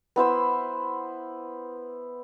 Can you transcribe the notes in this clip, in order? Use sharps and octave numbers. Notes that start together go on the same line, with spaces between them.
B3 E4 C5 E6